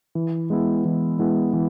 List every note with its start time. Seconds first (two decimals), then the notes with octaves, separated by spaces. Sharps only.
0.15 E3
0.50 G#3 B3 E4
0.85 E3
1.19 G#3 B3 E4
1.53 E3